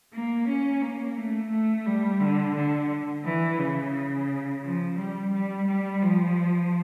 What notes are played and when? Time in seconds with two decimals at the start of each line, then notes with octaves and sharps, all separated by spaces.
0.13 A#3
0.48 C#4
0.82 A#3
1.17 A3
1.51 A3
1.86 G3
2.20 D3
2.55 D3
3.24 E3
3.59 C#3
4.63 F3
4.97 G3
5.33 G3
5.67 G3
6.02 F3